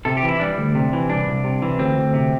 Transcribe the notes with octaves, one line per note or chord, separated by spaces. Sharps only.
C3 A4
G4
E3
E4
G3 D4
D2
C3
E3
C2 D4
C2
C3
E3
D2 C4
D2
C3